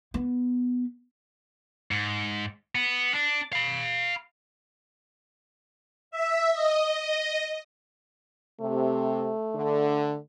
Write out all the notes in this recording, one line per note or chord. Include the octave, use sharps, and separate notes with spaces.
B3
G#2
B3
D4
F5 B5
E5
D#5
D#5
C3 A3
D3